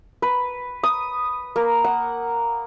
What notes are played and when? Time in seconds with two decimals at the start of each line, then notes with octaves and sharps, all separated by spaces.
0.22 B4
0.83 D#6
1.56 A#3
1.84 F#5